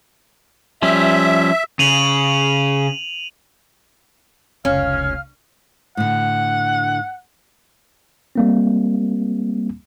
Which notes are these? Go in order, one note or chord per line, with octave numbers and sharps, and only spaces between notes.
F3 G3 C#4 E5
C#3 D#7 F7 F#7
F1 C#2 C#4 F5 F6
A2 D3 F#5
G3 A#3 C4